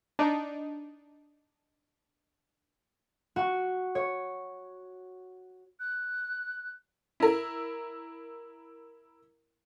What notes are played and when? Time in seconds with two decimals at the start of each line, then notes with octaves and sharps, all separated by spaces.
0.19 D4 D#4
3.36 F#4
3.95 C#5
5.80 F#6
7.20 E4 A#4